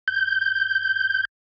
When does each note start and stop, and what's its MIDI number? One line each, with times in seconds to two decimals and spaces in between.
0.08 1.25 91